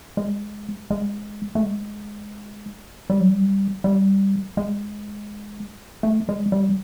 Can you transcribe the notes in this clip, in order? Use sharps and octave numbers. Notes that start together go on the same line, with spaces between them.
G#3
G#3
A3
G#3
G3
F#3
G3
G3
G#3
A3
G#3
G3